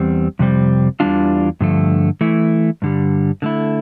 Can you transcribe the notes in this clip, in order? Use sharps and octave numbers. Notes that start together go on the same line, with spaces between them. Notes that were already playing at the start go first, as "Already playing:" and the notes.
Already playing: E2 G3 C4
F2 C3 G3 C4
E2 E3 G3 D4 F4
G2 D3 F3 A3
E3 A3 E4
G2 D3 G3
D3 A3 E4